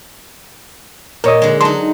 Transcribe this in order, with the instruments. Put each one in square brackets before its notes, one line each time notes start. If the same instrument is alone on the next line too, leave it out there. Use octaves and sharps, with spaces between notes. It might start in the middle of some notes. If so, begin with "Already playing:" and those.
[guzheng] A#2 [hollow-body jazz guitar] A#4 C#5 D#5
[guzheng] D3 G#3
[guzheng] F#3 D#4 [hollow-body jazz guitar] A5 C6